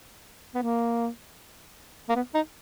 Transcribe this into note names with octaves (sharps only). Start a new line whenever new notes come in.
B3
A#3
A#3
B3
D#4